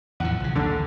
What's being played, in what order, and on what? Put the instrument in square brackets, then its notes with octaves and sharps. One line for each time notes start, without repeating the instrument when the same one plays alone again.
[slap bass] E2 A2 F3 [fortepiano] F#5
[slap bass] B1 C#3
[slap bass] A#1 D#2 [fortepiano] D3 D4